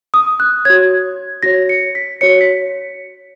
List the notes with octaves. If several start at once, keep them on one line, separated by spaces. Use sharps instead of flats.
D#6
F#6
F#4 C#5 G#6
F#4 C#5 A#6
C#7
B6
F#4 C#5 C#7
B6